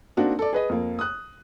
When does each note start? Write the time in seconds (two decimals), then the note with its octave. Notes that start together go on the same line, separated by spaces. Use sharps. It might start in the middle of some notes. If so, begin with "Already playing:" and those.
0.17 A#3 C4 D4 D#4 F#4
0.39 A4 D5
0.53 G#4 B4 D#5
0.69 F2 A#3
0.99 D#6 F#6